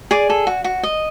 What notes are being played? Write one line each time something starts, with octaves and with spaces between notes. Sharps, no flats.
G#4 D5 G#5
A4
F#4
F#4
D#5